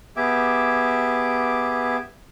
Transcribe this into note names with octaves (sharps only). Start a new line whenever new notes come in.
B3 G4 G#4 E5 D6